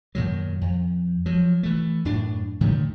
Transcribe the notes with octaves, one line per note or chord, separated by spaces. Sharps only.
F#2 A#2 D#3 F#3
F2
F3 F#3
E3 A3
F#2 A2 D4
A2 D3 D#3 A3